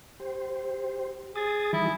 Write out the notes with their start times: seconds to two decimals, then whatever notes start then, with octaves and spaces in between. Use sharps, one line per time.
0.20 G4 C5
1.35 G#4 D#6 A6
1.73 D#3 E3 G3 E4